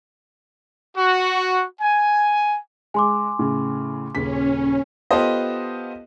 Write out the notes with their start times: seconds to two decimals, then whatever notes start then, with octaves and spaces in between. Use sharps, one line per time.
0.97 F#4
1.81 G#5
2.94 G#3 G#5 C6 D6
3.39 A2 C#3
4.15 D#1 C#3 C#4 B6
5.11 B3 F4 G4 A4 C5 D#5